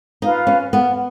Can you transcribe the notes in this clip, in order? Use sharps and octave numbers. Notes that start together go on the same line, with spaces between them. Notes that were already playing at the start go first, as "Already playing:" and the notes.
D#4 F4 B4 F5
C#4
B3